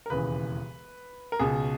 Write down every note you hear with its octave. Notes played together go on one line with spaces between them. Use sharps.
A#4
E1 D#2 C#3 E3 B4
A#4
C#2 B2 G#4